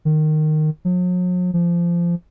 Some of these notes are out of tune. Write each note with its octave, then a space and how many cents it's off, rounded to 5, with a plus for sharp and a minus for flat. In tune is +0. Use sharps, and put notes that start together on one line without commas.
D#3 -15
F#3 -45
F3 -20